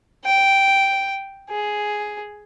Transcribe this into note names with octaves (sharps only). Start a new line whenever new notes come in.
G5
G#4